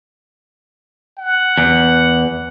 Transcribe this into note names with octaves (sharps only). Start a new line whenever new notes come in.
F#5
E2